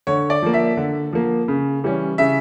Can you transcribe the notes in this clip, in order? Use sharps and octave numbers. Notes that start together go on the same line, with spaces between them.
D3 C#5
D5
F3 A#3
E5
D3
F3 A#3
C#3
E3 G3 C#4
C#3 E5